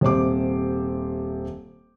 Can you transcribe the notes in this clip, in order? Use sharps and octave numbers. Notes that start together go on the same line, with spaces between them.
D#1 C3 C5 D6